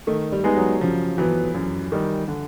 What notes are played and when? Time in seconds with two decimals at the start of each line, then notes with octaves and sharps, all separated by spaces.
0.07 D#3 A3
0.32 G3
0.44 G#3 B3 D#4 G#4
0.57 F#3
0.81 C#3 F3
1.18 E3 F#3 B3
1.54 F#2
1.92 D#3 G3
2.28 D3